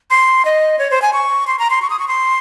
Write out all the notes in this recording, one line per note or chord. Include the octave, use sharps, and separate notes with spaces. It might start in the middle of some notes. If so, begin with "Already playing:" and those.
C6
D#5
C#5
C5
G#5
C#6
C6
A#5
C6
C#6
D#6
C#6
C6